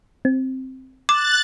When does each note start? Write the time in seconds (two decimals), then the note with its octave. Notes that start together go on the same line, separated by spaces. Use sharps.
0.25 C4
1.09 D6 F#6 A6 E7